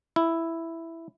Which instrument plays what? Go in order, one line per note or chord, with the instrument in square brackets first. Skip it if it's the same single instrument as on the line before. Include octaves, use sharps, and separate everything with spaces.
[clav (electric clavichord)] E4